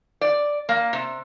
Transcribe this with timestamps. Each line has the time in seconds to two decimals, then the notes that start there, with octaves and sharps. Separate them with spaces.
0.21 D5
0.69 A#3
0.93 C3